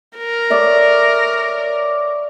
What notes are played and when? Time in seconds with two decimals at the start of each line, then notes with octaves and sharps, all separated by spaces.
0.18 A#4
0.50 C#5 D5 E5